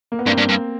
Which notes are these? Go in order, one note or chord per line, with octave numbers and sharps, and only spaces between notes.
A#3
B3
G2 A#3 C4
G2
G2